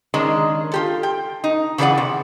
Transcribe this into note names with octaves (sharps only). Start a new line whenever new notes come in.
D#3 G#3 C#4 D4
F4 G4 A4
G5
D#4
C#3 E3 G#4 A4 D5 F#5
C3